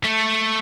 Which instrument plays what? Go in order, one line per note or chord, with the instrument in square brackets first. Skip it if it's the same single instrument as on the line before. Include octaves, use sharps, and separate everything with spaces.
[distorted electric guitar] A3